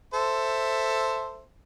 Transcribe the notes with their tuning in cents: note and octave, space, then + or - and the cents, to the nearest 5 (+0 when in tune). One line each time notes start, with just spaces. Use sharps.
A4 +10 C5 +0 E5 +0